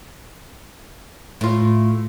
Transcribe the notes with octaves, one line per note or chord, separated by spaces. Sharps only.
A2 F4